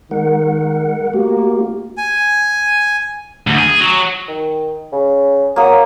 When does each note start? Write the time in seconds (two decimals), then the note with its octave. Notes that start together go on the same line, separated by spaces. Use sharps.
0.11 D#3 G#3 A#4 F#5
1.14 A3 A#3 F#4 G4
1.98 G#5
3.47 D2
3.59 G#4
3.80 F#3
4.28 D#3
4.92 C#3
5.56 F#3 A#3 D#6